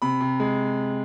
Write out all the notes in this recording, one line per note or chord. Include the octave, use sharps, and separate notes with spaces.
C3 B5
C3
G#3